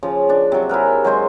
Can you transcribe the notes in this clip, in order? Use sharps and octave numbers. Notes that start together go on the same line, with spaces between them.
C#3 F3
D4 D5
C3 F#3
E4 G#4 A#4 F#5
F#3 G#3 C5 C#6